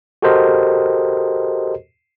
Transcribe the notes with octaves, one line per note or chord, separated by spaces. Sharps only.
F#4 G4 A4 A#4 C5 D#5